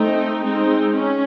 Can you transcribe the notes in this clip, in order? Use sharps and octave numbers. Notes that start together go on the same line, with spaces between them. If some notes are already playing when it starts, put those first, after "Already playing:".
Already playing: A3 C4 D#4
G#3 C4 D#4
C#4